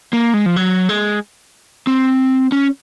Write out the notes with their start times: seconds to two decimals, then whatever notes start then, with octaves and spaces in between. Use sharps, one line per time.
0.13 A#3
0.34 G#3
0.46 F3
0.56 F#3
0.89 G#3
1.87 C4
2.52 C#4